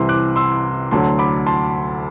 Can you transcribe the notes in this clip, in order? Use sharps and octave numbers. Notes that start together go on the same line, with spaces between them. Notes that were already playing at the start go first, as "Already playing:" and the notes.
Already playing: C2 C3 E3 C6 E6
D6 F#6
C6 E6
D2 D3 F#3 A5 C6
B5 D6
A5 C6